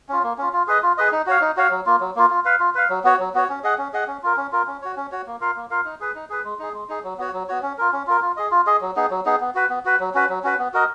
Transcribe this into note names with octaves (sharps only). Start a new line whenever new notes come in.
C#4 F4
A#3
C#4 F4
F4
G#4 B4 D#5
F4
G#4 B4 D#5
D#4
F#4 C#5 F5
D#4
F#4 C#5 F5
F#3
A#3 F4
F#3
A#3 F4
F4
B4 F5
F4
B4 F5
F#3
B3 F#4 C#5
F#3
B3 F#4 C#5
C#4
G#4 D#5 F#5
C#4
G#4 D#5 F#5
C#4
F4 A#4
C#4
F4 A#4
C#4
F#4 C#5
C#4
F#4 C#5
A#3
F4 A#4 F5
A#3
F4 A#4 F5
D#4
G#4 B4
D#4
G#4 B4
G#3
D#4 G#4
G#3
D#4 G#4
F#3
B3 F#4 C#5
F#3
B3 F#4 C#5
C#4
F4 A#4
C#4
F4 A#4
F4
G#4 D#5
F4
G#4 D#5
F#3
B3 D#4 G#4
F#3
B3 D#4 G#4
B3
F#4 B4
B3
F#4 B4
F#3
C#4 F#4 B4
F#3
C#4 F#4 B4
B3
F#4 A#4 D#5